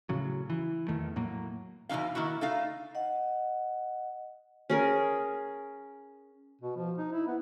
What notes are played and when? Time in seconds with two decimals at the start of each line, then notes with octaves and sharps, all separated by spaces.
0.09 A2 C#3 F#3
0.50 E3
0.88 E2 D#3 A3
1.16 A2 F#3 A#3
1.89 E2 B2 C#4 D#4 F5
2.15 D#3 A#3 E4 F#4
2.41 A3 D#4 F5
2.95 D#5 F#5
4.70 C#4 G#4 A#4
6.61 B2
6.77 F3
6.98 D#4
7.12 E4
7.27 B3